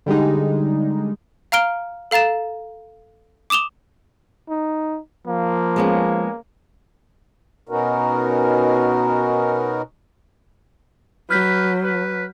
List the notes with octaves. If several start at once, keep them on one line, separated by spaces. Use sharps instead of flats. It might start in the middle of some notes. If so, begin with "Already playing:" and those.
D3 G3 G#3 D#4
F5 A#5 F6 D7 G7
A4 F5 A#5 A6 E7
D6 D#6 E7 F7 G7
D#4
F3 A#3
G#3 B3 C#4
B2 B3 C#4 D#4 F#4 A#4
F#3 B4 F6 G6 B6
B4